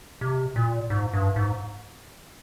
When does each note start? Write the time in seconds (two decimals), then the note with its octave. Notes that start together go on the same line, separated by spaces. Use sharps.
0.21 C3
0.56 A#2
0.90 G#2
1.13 G2
1.36 G#2